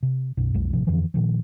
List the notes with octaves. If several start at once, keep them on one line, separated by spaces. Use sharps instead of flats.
C3
B1 F#2 B2
B1 F2 G#3
A1 C3 F3
F2 D3 E3 F3
A#2 D#3 F3